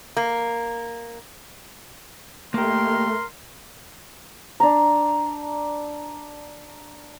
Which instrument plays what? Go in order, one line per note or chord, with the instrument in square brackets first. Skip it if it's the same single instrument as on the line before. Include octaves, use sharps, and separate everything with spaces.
[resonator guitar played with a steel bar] A#3
[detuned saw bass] A3 [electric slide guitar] A#3 G4 [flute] A#4 [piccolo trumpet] C6
[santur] D4 A#5